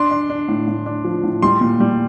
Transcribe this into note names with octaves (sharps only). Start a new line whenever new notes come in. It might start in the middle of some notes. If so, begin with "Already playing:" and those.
Already playing: D4 C6
D4
D4
A2
A2
D4
F3
A2
G3 C6
A#2
G3